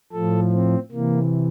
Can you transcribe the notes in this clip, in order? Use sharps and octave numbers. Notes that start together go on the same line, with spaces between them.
A2 F3 A4
C4
C3 E3 A#3